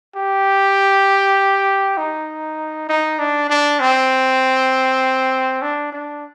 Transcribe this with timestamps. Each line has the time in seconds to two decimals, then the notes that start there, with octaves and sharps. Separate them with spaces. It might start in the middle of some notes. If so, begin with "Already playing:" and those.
0.15 G4
1.97 D#4
2.89 D#4
3.19 D4
3.49 D4
3.80 C4
5.62 D4
5.92 D4